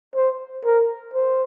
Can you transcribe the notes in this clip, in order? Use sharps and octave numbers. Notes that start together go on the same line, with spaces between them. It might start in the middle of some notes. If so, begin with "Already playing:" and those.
C5
A#4
C5